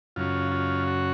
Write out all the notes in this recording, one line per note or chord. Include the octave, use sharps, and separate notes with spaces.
F#2 C#3 F#3 C#4 F4
F4
F#4